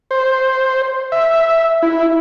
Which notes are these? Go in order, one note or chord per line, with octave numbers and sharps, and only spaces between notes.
C5
E5
E4